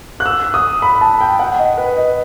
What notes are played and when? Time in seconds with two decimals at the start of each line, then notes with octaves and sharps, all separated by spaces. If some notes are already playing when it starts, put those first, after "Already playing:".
0.20 F#6
0.26 E6
0.54 D#6
0.82 B5
1.01 A5
1.21 G5
1.39 F#5
1.59 D#5
1.77 B4
1.97 D#5